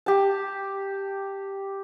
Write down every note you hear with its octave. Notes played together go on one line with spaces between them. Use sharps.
G4 A5